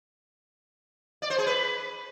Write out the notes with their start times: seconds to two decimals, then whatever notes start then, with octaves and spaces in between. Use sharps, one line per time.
1.22 D5
1.30 C5
1.38 G#4
1.46 B4